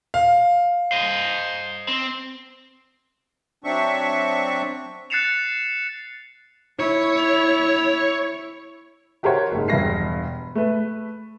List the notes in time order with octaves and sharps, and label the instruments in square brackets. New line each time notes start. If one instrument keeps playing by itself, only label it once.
[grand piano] F5
[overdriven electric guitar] C5 D#5
C4
[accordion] F#3 C4 D4 E5 C#6
[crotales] F#6 A6 C7 C#7 E7 F7
[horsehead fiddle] E4 [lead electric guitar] C#5
[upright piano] F#4 G4 A#4 C5 C#5 F#5
F#1 G#2
E1 G2 A#6 C7
A3 B4